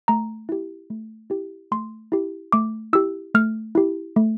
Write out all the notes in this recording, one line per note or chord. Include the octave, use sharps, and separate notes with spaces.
A3 A#5
E4 G4
A3
E4 G4
A3 C6
E4 G4
A3 D6
E4 G4 E6
A3 F6
E4 G4
A3